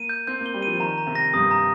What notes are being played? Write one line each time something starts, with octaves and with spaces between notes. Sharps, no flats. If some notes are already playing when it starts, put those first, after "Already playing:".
Already playing: A#3 D#7
G6
C4 G6
A#3
G7
G3
F3 D#7
D#3 A#5
A#5
C3
A#6
G2 D#6
A#5